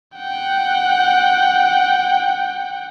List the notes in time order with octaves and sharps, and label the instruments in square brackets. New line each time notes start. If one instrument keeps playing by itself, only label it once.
[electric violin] F#5 G5